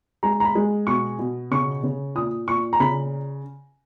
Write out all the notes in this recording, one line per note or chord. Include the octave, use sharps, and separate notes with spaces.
G#3 A#5
A#5
B5
G#3
B2 C#6
B2
C#3 C#6
C#3
A#2 D#6
A#2 C#6
A#5
C#3 B5